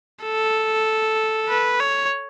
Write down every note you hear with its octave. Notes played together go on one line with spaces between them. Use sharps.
A4
B4
C#5